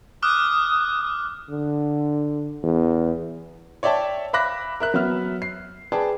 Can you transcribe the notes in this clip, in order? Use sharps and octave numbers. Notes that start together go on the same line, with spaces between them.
D6 D#6 F6 F#6
D3
E2
C#5 D5 E5 G5 A5
E5 F5 B5 D6 F#6 A#6
A#4 E5 F#6
F#3 B3 E5 F6
C7
G#4 B4 D5 G5 A5